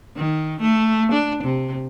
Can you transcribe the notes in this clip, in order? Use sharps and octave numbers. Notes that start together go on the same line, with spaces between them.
D#3
A3
D4
C3